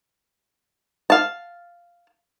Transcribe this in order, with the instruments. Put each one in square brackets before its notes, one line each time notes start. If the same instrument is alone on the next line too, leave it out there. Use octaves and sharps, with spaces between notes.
[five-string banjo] F5 A5